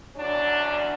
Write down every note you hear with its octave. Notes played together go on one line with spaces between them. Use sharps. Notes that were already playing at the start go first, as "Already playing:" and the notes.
E2 D3 F#3 C#4 D4